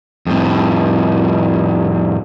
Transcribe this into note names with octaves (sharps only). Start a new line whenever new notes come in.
F2 A2